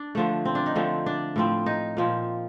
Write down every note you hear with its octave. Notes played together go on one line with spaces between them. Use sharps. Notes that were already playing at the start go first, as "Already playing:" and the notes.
Already playing: D4
D3 F3 A3
C4
D4
D#4
D3 F3 A3 C4
D4
A2 F3 C4
D#4
A#2 F3 C4